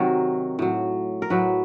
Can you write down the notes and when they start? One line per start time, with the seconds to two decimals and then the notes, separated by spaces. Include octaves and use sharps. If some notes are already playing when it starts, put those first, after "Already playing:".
Already playing: C3 D#3 F#3 A#4
0.59 A2 F#3
1.22 A#4
1.30 A2 F#3 B4